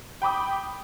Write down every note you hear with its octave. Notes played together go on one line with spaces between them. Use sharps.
G5 B5 D6 D#6